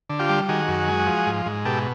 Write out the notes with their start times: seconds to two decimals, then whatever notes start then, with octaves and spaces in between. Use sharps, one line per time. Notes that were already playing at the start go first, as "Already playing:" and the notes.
0.09 D3
0.19 F4 G4
0.29 G3
0.49 D#3 F#4 G#4
0.68 F#2
0.88 G#3
1.07 F3
1.27 G#2
1.46 G#2
1.65 B2 G4 A4